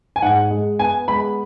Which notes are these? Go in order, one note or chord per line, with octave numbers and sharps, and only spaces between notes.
G#5
G#2 F#5
G#3
B3 G#5
G#3 B5